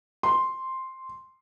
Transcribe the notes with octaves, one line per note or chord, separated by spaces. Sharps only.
C6